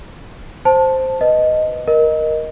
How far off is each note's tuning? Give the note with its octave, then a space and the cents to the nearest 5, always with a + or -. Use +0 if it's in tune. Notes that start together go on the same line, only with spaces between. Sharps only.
C5 +0 A5 +0
B4 +0 D#5 +0
A#4 +10 D#5 +0